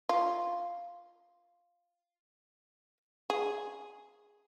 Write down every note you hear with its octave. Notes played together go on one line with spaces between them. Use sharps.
F4
G#4